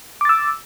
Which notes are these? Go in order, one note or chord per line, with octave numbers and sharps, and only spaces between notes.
D6 E6 A6